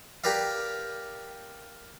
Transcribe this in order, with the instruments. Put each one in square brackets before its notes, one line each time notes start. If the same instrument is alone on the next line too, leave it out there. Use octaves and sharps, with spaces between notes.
[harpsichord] G4 A#4 B4 D5 F5